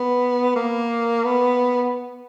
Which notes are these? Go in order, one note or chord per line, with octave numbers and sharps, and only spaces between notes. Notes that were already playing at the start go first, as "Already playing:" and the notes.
Already playing: B3
A#3
B3